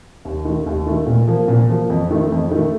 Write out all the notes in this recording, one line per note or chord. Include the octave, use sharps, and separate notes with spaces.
D#2
D#3 A3
D#2
D#3 A3
A#2
F3 A#3
A#2
F3 A#3
F2
D#3 A3
F2
D#3 A3